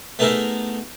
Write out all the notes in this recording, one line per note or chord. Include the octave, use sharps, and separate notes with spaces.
A3 B3 D#4 G#4 A#4 E5